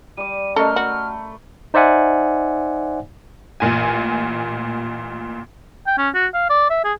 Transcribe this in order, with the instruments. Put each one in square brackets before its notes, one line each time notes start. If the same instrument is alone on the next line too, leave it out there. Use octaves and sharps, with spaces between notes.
[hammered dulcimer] G3 D6 [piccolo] D#7
[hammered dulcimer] A3 A#4 [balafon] C#4 D5 D#5 [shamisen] A4 [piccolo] F6
[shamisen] F#4 [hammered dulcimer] B5
[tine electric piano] D#4 C5 D5 E5 F#5 G#5
[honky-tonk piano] A1 A#2 G#5
[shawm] G5
C#4
F#4
F5
D5
E5
G#4